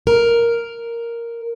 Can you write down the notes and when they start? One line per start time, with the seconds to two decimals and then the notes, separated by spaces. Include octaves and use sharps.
0.07 A#4